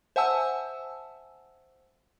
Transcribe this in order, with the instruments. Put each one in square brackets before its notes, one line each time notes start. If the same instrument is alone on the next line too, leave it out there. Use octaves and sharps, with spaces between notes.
[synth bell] C5 E5 F#5 G#5 A5 E6